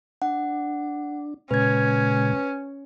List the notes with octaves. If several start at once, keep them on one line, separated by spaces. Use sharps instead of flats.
D4 F#5
A#2 C#3 G#3 C#4 B4 G#6